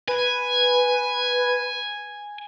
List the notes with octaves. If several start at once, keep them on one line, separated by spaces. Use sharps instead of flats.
B4 G#5